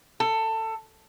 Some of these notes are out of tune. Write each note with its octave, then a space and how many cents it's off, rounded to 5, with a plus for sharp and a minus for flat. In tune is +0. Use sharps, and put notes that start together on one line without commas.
A4 +20